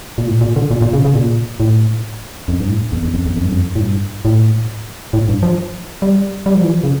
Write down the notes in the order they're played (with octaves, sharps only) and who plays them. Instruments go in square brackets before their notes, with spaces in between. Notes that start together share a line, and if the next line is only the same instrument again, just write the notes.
[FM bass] A#2
A2
A#2
D3
A#2
A#2
C#3
C#3
A#2
A2
F2
G2
A2
E2
E2
F2
E2
F2
G2
F2
A2
G2
A2
A2
G2
F3
G3
G3
F3
E3
F3
C#3